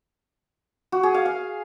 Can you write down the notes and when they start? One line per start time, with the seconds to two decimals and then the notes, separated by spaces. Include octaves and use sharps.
0.92 F#4
1.03 G#4
1.14 F5
1.26 F5